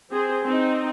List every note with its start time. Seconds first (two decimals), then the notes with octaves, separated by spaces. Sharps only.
0.11 C4 G#4 C5
0.45 C4 D#4